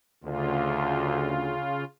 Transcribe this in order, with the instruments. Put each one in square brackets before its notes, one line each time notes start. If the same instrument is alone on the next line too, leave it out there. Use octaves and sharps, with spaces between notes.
[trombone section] D2 [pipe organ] C#3 F4